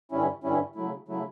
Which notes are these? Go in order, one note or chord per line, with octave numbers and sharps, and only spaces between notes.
G2 D3 G3 C#4 E4
G2 D3 G3 C#4 E4
C#3 F#3 A3 E4
C#3 F#3 A3 E4